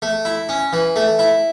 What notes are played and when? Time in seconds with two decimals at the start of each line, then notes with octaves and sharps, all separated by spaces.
0.02 A3
0.25 E4
0.49 C#4
0.73 E3
0.96 A3
1.19 E4